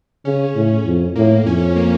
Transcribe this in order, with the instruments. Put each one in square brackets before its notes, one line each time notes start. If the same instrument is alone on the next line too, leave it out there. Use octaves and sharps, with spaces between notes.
[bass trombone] C#3 [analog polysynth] C#4
[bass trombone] A2
F2
[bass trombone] A2 [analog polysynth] A#3
[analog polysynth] A#3
[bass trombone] F2 [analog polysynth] C#4
[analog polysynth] A#3